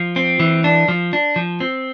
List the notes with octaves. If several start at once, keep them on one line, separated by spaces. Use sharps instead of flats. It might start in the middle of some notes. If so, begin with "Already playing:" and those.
Already playing: F3
C4
E3
D4
F3
D4
F3
C4